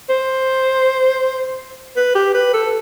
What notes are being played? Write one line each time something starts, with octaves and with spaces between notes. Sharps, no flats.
C5
B4
G4
B4
A4